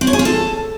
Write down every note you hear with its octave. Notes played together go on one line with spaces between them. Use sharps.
C4
C#5
G#4
F4
A4